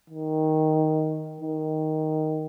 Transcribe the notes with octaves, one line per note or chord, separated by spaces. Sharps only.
D#3
D#3